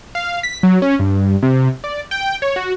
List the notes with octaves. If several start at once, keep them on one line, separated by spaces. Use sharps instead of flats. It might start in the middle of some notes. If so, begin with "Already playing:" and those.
F5
B6
F#3
C#4
G2
C3
D5
G5
C#5
F#4